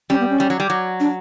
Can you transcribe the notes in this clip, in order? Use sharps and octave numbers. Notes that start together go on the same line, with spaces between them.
G3 C#4
B3
C#4
G3
F#3
G3
F#3
D4